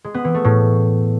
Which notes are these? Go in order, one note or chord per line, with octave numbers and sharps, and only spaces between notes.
G#3
B3
E3
A3
A2